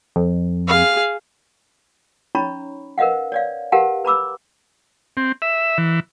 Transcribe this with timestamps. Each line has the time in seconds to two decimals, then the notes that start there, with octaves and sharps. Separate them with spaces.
0.16 F2
0.68 G#4 F5
2.35 C#4 D#4 C#5 A#5 B5 C#6
2.98 A#4 B4 D#5 F5 F#5
3.32 C#5 D5 F5
3.72 G4 A#4 B4 F5 F#5 A5
4.05 B4 A#5 B5 D6 E6
5.17 C4
5.42 E5
5.78 E3